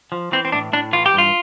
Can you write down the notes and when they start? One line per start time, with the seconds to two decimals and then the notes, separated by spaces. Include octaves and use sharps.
0.12 F3
0.32 E3 C4
0.45 C4
0.52 A2 D4
0.73 A2 D4
0.93 E3 F4
1.06 G4
1.14 G2 F4